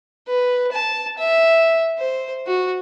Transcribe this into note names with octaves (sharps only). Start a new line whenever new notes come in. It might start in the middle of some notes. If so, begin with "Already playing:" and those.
B4
A5
E5
C5
F#4